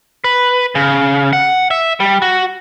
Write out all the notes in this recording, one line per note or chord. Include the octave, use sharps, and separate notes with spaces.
B4
C#3
F#5
E5
G3
F#4